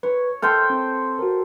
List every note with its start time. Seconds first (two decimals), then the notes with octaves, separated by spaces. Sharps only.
0.03 B4 C#5
0.42 A4 C5 G5 F6
0.70 C4
1.19 F#4 A#4